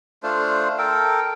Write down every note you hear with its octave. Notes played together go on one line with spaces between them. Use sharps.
A3 D4 F4 C5
A4 A#4 G5